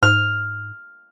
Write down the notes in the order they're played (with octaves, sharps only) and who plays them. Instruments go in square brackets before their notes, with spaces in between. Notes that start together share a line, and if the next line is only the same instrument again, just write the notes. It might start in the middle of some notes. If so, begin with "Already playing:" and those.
[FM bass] G#2 [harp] F6